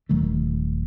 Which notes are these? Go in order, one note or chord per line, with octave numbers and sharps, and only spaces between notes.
D#1 D#3 F#3 A3